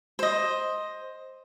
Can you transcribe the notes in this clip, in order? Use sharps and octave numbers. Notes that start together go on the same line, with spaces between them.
C5 D#5